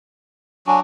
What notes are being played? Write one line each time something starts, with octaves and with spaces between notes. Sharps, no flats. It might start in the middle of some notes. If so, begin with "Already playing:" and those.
F#3 D4 F#4 G#5